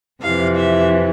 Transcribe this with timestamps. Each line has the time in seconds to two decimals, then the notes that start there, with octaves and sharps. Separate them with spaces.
0.22 F2 C3 E3 F5
0.57 E5